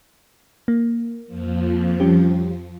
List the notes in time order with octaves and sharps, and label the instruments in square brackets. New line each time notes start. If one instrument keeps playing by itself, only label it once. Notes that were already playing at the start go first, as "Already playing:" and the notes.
[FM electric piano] A#3
[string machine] F2 F3
[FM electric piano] G3 C#4 G4